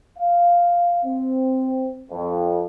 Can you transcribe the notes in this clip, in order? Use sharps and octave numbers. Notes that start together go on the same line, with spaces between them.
F5
C4
F2